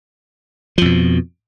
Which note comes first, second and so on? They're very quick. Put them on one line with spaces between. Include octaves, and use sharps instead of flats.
F3 F2 B2